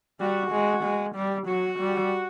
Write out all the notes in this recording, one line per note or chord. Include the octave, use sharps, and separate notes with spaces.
G3 F#4
G#3
G#3
G3
F#3 F#4
G3